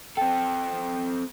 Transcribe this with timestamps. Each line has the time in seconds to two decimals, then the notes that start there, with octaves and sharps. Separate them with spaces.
0.17 C4 A4 G5